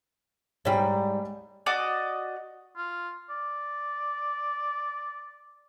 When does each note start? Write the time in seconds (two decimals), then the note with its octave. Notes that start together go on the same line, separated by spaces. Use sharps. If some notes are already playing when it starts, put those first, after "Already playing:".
0.65 G#2 G3 C#5 G5 B5
1.66 F#4 D5 D#5
2.77 F4
3.30 D5